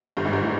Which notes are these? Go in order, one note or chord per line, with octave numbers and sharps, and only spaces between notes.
G1 G2
G#1 G#2
G1 G2
A2